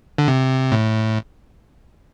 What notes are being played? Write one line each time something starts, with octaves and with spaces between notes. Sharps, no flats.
D3
C3
A2